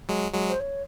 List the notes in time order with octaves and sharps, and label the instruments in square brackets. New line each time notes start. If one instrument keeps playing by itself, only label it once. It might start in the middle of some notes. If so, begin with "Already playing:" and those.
[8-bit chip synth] F#3 G#3
F#3 G#3
[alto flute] C5
C#5